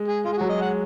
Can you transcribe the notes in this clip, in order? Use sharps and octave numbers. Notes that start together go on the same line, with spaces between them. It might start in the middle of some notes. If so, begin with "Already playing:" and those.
Already playing: G#3
G#4
G#3 F4
G#4
F#3 F#4
D#5
G#3
F#5